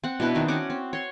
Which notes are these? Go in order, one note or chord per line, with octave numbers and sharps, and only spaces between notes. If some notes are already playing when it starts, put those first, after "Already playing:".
C4 F#5
B2 D4 E4 B4
D#3 C4 D4 D#4
C#4 F#4 F#5 D6
C4
C#5 C6